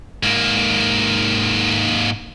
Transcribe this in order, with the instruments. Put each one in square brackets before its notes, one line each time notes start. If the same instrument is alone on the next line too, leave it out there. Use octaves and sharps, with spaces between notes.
[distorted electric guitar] G#2 A#3